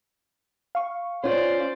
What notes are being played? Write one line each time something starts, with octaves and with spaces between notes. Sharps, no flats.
F5 C#6
C#4 F4 C5 D5